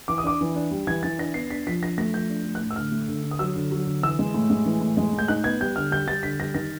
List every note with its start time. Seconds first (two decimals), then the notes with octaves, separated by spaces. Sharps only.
0.08 E3 D6
0.18 D#6
0.24 D4 D6
0.41 E3
0.56 D4
0.71 G3
0.87 E3 G#6
1.03 E3 A6
1.18 D4 A#6
1.34 B3 C7
1.50 D4 B6
1.67 F3 B6
1.81 D4 A#6
1.98 A3 A#6
2.14 F3 G6
2.29 D4
2.45 A3
2.55 F#6
2.61 A2
2.71 E6
2.76 D3 F6
2.92 A3
3.08 D3
3.23 D3
3.31 D#6
3.39 F#3 E6
3.55 D3
3.72 F#3
3.87 D3
4.03 E3 E6
4.19 G#3
4.34 A2
4.50 G#3
4.66 E3
4.81 A2
4.97 G#3
5.13 A2
5.19 G6
5.28 D#4 F#6
5.44 B3 G#6
5.60 G3 G6
5.76 D3 F6
5.91 G3 G6
6.07 G3 A6
6.23 D3 B6
6.40 G3 A#6
6.54 D#3 A#6